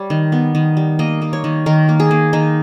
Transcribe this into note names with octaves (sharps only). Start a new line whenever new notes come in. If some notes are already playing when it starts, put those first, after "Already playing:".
Already playing: G3 C#5
D#3
B3
D#3
G3
A#3 D#5
A#3
C#5
D#3
D#3 A#4
A#3
G#4
A#3
D#3 D#4